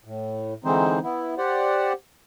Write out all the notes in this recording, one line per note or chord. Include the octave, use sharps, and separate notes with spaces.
A2
D3 E3 G#3 C4 D#4 C5
B3 E4
G4 C5 D5 F#5